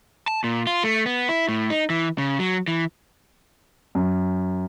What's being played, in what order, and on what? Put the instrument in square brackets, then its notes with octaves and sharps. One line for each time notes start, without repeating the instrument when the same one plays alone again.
[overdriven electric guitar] A5
A#2
F4
A3
B3
E4
A2
D#4
E3
C#3
F#3
E3
[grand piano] F#2